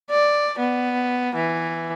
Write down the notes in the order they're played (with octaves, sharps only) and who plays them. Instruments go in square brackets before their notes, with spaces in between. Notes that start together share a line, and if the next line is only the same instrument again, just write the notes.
[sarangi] D5
B3
E3